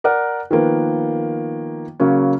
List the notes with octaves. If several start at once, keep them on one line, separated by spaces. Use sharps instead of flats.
A#4 D5 F#5
D#3 F3 A#3 B3
C#3 F#3 A#3 C#4